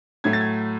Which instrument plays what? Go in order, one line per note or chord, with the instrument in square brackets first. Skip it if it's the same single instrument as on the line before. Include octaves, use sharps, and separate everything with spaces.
[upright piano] A2 F#3 A3 G#6
A6
G#6